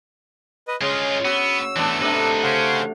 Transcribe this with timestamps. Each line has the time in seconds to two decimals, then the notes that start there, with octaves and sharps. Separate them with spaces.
0.68 B4 D#5
0.81 C#3 G#3 F4 G#4
1.25 B3 F#4 E6
1.76 E3 A3 B3 D4
2.01 C3 A3 D4 D#4 B4
2.43 C#3 C#4 C5 F5 F#5